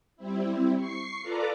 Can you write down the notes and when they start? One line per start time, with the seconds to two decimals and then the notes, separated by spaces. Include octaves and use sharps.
0.17 G3 C4 E4
0.75 C#6 C7
1.22 F4 A4 B4 D5 A#5 D6